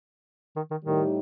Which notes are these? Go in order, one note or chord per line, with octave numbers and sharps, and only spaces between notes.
D#3
D#3
A2 D#3 G3 D#4 G4